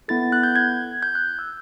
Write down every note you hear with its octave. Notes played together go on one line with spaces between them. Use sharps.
B3 E4 A4 A6
F#6
G6
G#6
G6
F#6
E6